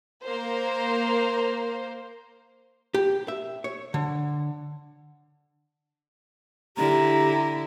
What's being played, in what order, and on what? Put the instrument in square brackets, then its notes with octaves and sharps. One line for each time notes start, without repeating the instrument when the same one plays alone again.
[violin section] A#3 C5
[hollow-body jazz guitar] G4
E5
C#5
D3
[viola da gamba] D3 E4 [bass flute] G4 [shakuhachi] A#5